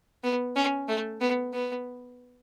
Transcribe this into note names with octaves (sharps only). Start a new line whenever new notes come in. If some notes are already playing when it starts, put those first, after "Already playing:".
B3
C#4
A3
B3
B3